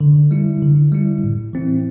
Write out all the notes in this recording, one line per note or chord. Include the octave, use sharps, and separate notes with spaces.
D3
G3 E4
D3
G3 E4
A2
E3 C4 E4